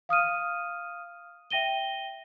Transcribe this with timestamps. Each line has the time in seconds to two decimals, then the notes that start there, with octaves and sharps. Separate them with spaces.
0.09 F5 D#6 F6 D#7
1.51 E5 G5 A#6 D#7 G7